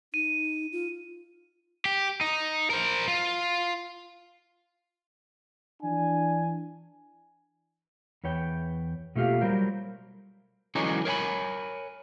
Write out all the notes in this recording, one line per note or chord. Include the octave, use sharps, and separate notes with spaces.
D#4 D#7
F4
G4
D#4
A#4 C5
F4
E3 D4 G#5
E2 B4 C#5 G5
B2 A3 A#3 F4 G4 F5
F#3 G3 A#4 C5
D3 E3 F#3 G#3 C#4 D#4
A#4 C#5 E5 G#5 B5